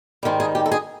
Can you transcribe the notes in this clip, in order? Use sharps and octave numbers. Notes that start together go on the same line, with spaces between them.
G#2 D#3 G3
G#4
G4
A4
G#4